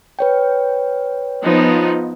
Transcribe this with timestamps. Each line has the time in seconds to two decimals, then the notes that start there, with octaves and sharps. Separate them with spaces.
0.19 B4 C#5 G5
1.44 F3 B3 D#4